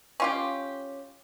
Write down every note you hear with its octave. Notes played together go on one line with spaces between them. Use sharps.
C#4 F4 G4